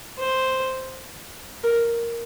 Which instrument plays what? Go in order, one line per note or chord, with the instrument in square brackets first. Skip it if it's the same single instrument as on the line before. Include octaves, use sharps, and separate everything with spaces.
[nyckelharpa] C5
A#4